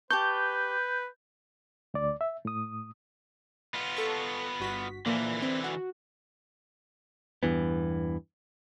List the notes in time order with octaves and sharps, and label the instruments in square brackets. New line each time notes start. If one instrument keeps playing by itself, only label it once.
[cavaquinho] G4 A5 C#6 [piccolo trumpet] B4 [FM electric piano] G6
[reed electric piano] D2 D5
E5
A2 D#6
[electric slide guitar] B3 F4
[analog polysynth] A4 C#6
G1 F#4 B6
[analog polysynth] A#2 F3 A#3 [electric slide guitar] D3 E3 E4
[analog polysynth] C4
F#4
[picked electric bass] E2 G2 E3 B3